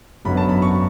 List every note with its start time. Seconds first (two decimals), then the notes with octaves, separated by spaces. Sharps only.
0.25 G#1 F#2 D3 F#3 B3 B5
0.37 A5
0.49 B5
0.62 C#6